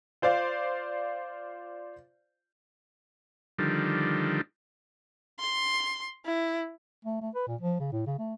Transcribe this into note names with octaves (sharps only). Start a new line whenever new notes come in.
F4 C5 D5 F5
D3 D#3 F3 G3
C6
E4
A3
A3
B4
A#2
F3
C#3
A2
C#3
A3